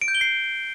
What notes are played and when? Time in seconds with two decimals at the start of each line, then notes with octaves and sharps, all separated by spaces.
0.02 D7
0.08 G6
0.15 G7
0.21 C7